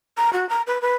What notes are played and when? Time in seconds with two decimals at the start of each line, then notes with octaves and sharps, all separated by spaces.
0.17 A#5
0.33 F#4
0.49 A#5
0.67 B4
0.82 B4